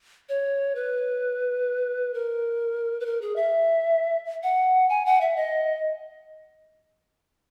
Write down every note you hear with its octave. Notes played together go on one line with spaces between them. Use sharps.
C#5
B4
A#4
B4
A#4
G#4
E5
F#5
G#5
F#5
E5
D#5